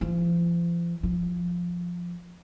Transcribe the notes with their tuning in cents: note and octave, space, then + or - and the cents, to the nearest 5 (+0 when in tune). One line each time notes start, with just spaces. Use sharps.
F3 -35
F3 +5